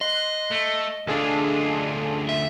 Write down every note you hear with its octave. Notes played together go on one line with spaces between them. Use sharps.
D#5 C6 F#6
A3
D2 D4 F4 G#4 A4
E5